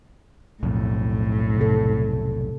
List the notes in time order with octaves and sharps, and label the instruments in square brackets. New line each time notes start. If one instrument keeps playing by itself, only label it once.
[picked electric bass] B1 F2 [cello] A2
[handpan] C3 A4